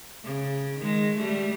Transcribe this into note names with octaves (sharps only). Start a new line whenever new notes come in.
C#3
D#3 G#3
G3 A3